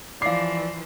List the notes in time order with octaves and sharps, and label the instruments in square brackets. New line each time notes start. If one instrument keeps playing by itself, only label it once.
[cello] E3 F3 [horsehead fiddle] D5 [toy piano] F5 D6 [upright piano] C7